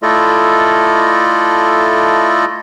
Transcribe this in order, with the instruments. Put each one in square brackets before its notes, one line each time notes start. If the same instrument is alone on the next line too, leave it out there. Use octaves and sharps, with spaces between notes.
[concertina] A3 E4 F4 A4 D5 D#5